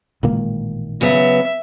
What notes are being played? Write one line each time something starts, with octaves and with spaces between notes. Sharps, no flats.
A1 A#2 D#3 G#3 A#3
C#3 F#3 B3 E5